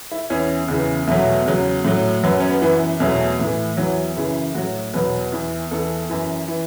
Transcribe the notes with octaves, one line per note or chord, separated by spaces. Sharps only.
E4
E2 E3 C#4
E2 C#3 E3
E2 B2 F#3 A3
E2 C#3 F#3
A2 F#3
F#2 F#3 B3
C#4
B3
F#2 E3 B3
E2 B2 F#3 A3
A2 E3
E2 E3 F#3
F#2 C#3 E3
A2 F#3 F#4
E2 B2 F#3 B4
E2 E3
E2 E3 A4
F#2 E3
E3